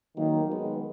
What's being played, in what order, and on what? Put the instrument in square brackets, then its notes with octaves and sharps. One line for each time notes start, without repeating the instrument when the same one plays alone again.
[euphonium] D#3 [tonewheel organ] F#3 A#3
[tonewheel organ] G#3 B3